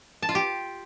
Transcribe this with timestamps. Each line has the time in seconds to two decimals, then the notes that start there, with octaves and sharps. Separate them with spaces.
0.22 A5
0.29 F4
0.35 G4